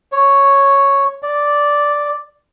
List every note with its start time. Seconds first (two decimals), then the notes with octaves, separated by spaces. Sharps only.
0.12 C#5
1.23 D5